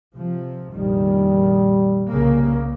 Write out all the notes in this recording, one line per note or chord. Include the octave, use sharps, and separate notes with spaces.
C3 F3
F1 A#1 D#3 G3
C2 C#3 A#3